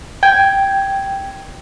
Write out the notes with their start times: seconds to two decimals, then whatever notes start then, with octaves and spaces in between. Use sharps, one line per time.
0.23 G5 G#6